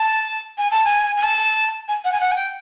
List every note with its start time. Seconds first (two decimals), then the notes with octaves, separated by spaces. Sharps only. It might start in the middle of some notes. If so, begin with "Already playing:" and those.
Already playing: A5
0.58 G#5
0.70 A5
0.85 G#5
1.17 G#5
1.23 A5
1.88 G#5
2.04 F#5
2.12 G#5
2.20 F#5
2.31 G#5
2.35 G5